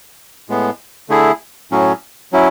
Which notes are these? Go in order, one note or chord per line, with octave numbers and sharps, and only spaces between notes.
A2 G#3 B3
D3 A3 E4 G#4
A2 F#3 C#4
F#3 C#4 E4